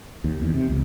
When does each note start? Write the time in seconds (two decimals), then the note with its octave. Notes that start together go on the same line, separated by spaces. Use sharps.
0.24 D#2
0.42 E2
0.54 C3
0.69 C#2